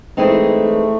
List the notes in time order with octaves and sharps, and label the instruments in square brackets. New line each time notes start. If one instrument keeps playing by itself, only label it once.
[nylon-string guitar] E3 G#3 C4 D#4 [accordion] A3